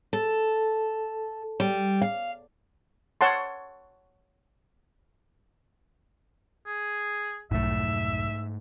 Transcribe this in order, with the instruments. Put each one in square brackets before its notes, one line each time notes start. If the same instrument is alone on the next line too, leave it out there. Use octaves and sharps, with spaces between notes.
[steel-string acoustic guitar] A4
G3
F5
[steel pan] C#5 F#5 A5 C6
[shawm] G#4
[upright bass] B1 F2 [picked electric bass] G#2 A3 [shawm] E5